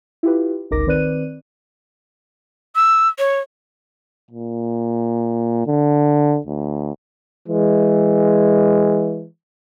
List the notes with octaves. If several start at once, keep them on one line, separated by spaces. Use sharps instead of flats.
E4 F4 G4 B4
G1 C#2 D#4 A#4 D6 A#6
D#3 C4 B4 D5 F#6 D#7
E6
C#5
A#2
D3
D2
E3 G#3